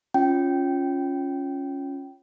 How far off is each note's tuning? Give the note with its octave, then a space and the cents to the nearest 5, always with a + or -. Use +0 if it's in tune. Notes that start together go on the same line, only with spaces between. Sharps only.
C#4 +0 F4 +0 G5 -15